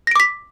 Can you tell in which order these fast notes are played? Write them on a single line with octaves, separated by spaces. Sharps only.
A#6 D7 D6 B6